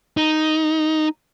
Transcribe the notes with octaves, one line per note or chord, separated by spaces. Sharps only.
D#4